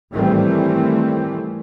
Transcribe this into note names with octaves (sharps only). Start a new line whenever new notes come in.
G#2 D#3 E3 G3 A3 C4